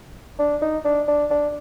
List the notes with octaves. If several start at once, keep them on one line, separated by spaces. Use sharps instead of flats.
D4
D#4
D4
D4
D4